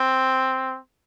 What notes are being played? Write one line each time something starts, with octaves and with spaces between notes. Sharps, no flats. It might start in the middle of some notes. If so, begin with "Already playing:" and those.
Already playing: C4